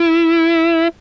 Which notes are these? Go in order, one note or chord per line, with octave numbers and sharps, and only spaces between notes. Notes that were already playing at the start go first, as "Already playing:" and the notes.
Already playing: E4